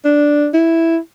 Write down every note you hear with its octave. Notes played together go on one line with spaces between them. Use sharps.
D4
E4